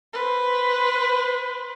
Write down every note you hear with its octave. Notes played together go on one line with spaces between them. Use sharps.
B4 C5